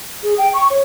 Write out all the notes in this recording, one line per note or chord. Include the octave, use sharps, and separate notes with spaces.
G#4
G5
C#6
C#5